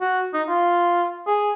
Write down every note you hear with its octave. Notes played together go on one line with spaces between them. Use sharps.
F#4
D#4
F4
G#4